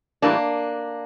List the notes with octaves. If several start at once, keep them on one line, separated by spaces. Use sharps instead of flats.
A2 E3 G3 A#3 D4